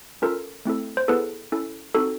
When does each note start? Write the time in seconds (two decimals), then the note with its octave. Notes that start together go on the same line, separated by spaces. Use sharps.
0.22 C#4 F4 A4 A#4
0.65 A3 C4 E4 A4
0.97 C5
1.08 B3 E4 G#4 A4 B4
1.52 C#4 E4 A4
1.95 C4 D#4 F#4 A4